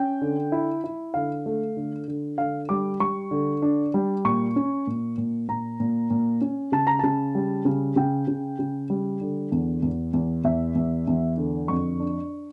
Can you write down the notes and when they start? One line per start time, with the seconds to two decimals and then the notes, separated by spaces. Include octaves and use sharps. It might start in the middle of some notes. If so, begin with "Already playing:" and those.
Already playing: C#4 G5
0.21 D3
0.52 E4
0.84 E4
1.14 D3 F5
1.46 A3
1.77 D3
2.08 D3
2.38 D3 F5
2.69 G3 D6
3.00 G3 C#6
3.31 D3
3.62 D4
3.94 G3
4.25 A#2 C#6
4.56 C#4
4.87 A#2
5.18 A#2
5.48 A#2 A#5
5.80 A#2
6.10 A#2
6.41 C#4
6.72 C#3 A5
6.87 A#5
6.99 C#3 A5
7.35 G3
7.65 C#3
7.96 C#3 G5
8.28 C#3
8.59 C#3
8.90 G3
9.21 D3
9.52 E2
9.82 E2
10.13 E2
10.44 E2 E5
10.75 E2
11.07 E2
11.37 D3
11.68 F2 C#6
12.00 D4